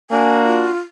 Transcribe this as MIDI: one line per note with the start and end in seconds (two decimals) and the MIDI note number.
0.11 0.71 58
0.11 0.71 62
0.11 0.71 66
0.11 0.33 80
0.44 0.77 65